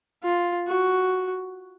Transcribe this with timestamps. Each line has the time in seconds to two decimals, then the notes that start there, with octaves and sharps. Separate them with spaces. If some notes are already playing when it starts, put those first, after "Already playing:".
0.23 F4
0.67 F#4